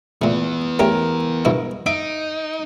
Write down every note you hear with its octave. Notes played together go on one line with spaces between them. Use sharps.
A#2 E3 A3 B3
A3 C#4 G4 A#4
G2 B2 E4
D#4 E5 D7